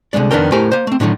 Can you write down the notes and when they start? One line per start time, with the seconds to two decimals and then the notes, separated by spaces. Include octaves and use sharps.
0.13 C2 B2 D3 G#3 D5
0.31 F2 D#3 B3 D4 A#4 G5
0.52 A2 A3 G4 A#4 C5 G#5
0.72 A#3 C5
0.87 A3 C4
1.00 A2 D3 D#3 F3 F#3